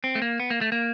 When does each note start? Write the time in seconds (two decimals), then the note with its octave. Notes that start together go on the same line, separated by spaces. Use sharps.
0.04 C4
0.15 A3
0.22 A#3
0.40 B3
0.50 A#3
0.61 A3
0.72 A#3